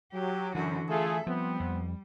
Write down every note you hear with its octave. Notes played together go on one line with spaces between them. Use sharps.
F#3 G4
F#2 D3 E3 F#4
A3 F4 G#4 A4 E5
F3 G3 B3 C4
F2